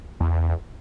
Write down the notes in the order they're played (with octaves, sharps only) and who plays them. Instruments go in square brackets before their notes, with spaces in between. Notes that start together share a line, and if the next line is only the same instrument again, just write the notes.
[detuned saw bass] E2